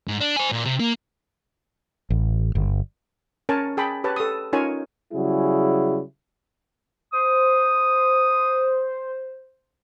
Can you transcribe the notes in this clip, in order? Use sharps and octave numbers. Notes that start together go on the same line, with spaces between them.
G#2
D4
C5 G#5
A#2
C3
A#3
A1
G1
C#4 A#4 C#5 G#5 A5
G#4 G5 A5 B5
G4 B4 C#5 A5
A4 D#6
C#4 D#4 F4 A#4 C#5 G#5
C#3 F#3 G3 E4 G#4
C5 D#6